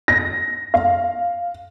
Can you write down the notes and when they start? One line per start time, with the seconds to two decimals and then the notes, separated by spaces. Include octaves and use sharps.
0.08 A#6
0.74 F5